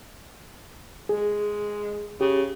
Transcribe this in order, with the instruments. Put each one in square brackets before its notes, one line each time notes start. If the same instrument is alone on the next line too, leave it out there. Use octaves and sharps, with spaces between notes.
[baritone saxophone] G#3 [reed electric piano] G#4
[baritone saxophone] C#3 [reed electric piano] G4